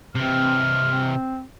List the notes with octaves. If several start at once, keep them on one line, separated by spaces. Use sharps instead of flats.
C3 E3 C4 F6
C4